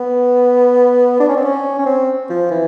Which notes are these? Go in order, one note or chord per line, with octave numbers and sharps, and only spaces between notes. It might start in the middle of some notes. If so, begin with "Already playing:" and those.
Already playing: B3
D4
C#4
C4
C#4
C#4
C4
F3
E3